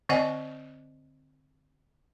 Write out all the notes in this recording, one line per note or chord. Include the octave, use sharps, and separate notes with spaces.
D3 C4 D5 D#5 F#5 G#5